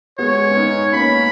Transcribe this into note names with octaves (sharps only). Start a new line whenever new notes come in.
G#3 B3 C#5
C#4
B3 D#4
A#3 C#4 B5